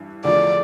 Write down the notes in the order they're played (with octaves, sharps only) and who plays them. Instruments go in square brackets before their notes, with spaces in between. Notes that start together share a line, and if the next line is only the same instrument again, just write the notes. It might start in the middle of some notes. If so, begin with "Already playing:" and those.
Already playing: [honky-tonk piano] G2 E3 E4
[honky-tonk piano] E2 D3 F3 A3 [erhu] D5